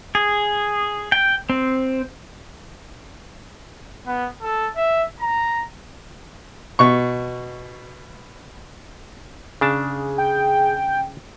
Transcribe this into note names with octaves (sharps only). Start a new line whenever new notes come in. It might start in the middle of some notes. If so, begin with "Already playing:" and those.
G#4
G5
C4
B3
A4
E5
A#5
B2 C#6
C#3 D4 G#4 A5
G5